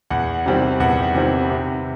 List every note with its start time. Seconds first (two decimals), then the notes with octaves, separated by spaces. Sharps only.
0.10 E2 F#5
0.46 C3 D#3 G3 C4
0.80 E2 F#5
1.15 C3 D#3 G3 C4
1.50 C3